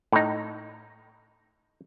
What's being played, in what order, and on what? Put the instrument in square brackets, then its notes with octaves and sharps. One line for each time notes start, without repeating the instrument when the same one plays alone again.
[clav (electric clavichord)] A2 D#4